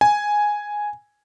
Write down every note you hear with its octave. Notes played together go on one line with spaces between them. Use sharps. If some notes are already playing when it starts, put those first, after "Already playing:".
G#5